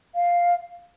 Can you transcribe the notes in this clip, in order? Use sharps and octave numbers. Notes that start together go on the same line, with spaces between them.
F5